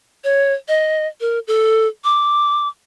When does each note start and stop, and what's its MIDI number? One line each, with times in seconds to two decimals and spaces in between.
0.24 0.53 73
0.68 1.07 75
1.21 1.39 70
1.47 1.87 69
2.04 2.68 86